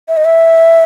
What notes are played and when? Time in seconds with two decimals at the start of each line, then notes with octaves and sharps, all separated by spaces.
0.08 E5
0.17 D#5
0.25 E5